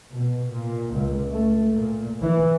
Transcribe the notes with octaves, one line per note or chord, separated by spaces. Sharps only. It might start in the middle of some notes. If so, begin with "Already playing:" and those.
B2
A#2
C#2
A3
A#2
E3